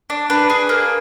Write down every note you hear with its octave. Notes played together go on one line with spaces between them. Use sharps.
D4
D4 B4
G#4
A#3